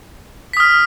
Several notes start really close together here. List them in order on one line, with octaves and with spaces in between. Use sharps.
B6 D#6 F6